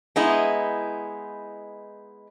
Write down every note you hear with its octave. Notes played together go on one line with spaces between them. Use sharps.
G#3 B3 D#4 E4